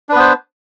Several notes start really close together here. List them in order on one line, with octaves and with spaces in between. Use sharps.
D4 B4 B3 C5